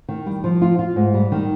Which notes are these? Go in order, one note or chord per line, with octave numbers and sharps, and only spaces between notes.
D#3
G3
F3
F4
F4
G#2
G3
D#3